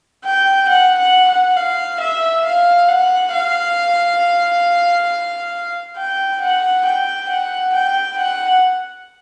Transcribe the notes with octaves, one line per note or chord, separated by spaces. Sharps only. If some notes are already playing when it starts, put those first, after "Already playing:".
G5
F#5
F#5
F#5
F5
E5
F5
F#5
F5
G5
F#5
G5
F#5
G5
F#5